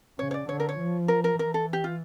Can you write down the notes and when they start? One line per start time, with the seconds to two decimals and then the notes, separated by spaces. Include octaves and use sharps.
0.19 C#3 C#5
0.31 C#5
0.34 D5
0.49 D3 C#5
0.60 A#4
0.69 C#5
0.79 F3
1.08 A#4
1.24 A#4
1.39 E3 A#4
1.54 A4
1.73 G4
1.84 F4